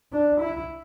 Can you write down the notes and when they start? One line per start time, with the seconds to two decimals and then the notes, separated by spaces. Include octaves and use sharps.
0.13 D4
0.41 E4